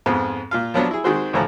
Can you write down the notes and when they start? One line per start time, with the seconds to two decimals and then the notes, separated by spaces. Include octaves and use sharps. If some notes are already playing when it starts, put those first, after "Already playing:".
0.06 F2 G#2 B3 C4
0.51 A#2 F4 F5
0.74 F3 F#3 B3 D4
0.91 E4 G#4
1.04 D#3 G#3 C4 F#4 G#4 C5
1.33 D2 A2 E3 F3 A#5